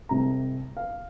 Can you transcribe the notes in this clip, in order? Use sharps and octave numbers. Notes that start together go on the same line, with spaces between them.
C2 C3 G#3 C4 A#5
F5